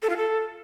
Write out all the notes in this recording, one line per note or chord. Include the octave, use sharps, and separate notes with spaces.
A4
F4
A4